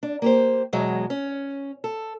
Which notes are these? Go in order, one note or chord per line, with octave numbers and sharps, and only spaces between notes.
D4
A#3 G4 C5
E2 B2 F#3 G#3
C#4
A4